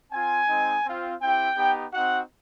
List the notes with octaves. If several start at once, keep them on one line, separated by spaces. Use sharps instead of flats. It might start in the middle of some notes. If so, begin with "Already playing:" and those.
C4 F4 G#5
G#3 C4 D#4
C4 F4
C4 E4 G4 G5
B3 D#4 G4
C4 D#4 F#4 F#5